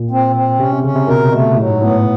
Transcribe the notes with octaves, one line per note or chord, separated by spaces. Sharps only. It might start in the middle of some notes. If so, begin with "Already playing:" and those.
Already playing: A#2
C4
C4
C3 C#4
C3
C#3 C#4
C3
B2 A#4
B2 A3
A2 F#3
G#2
A2 B3